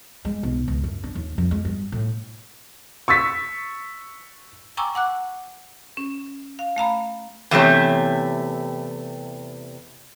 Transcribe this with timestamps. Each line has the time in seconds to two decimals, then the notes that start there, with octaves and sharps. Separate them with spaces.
0.25 G#3
0.43 B1
0.68 C#2
0.84 F#2
1.04 D4
1.15 D#2
1.38 F2
1.51 G#3
1.65 G2
1.92 A2
3.08 C#6 E6 A6 B6
4.77 G5 G#5 A#5 C#6 D6 E6
4.95 F#5 D6 F#6
5.97 C#4
6.59 F5
6.76 A3 F5 A#5 B5
7.51 E2 C3 A3 G4 C#5